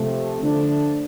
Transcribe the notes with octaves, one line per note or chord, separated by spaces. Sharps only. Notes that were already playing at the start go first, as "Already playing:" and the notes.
Already playing: C3 F3 A3
D3 F3 A3 D4